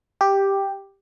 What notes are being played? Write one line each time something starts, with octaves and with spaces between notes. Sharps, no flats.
G4